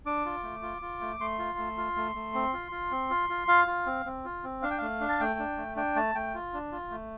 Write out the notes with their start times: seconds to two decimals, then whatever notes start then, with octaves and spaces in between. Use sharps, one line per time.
0.06 D4 D6
0.25 F4
0.43 A3
0.62 F4
0.82 F4
1.01 A3
1.20 A3 C6
1.39 F4
1.58 A3
1.77 F4
1.96 A3
2.15 A3
2.34 C4
2.53 F4
2.72 F4
2.91 C4
3.10 F4
3.29 F4
3.48 F4 F5
3.67 F4
3.86 C4
4.06 C4
4.25 F4
4.44 C4
4.62 D4 F5
4.71 G5
4.78 A3 F5
5.00 D4
5.09 A5
5.20 A3 G5
5.39 D4
5.57 A3
5.76 D4 G5
5.96 A3 A5
6.15 A3 G5
6.35 F4
6.53 D4
6.72 F4
6.91 A3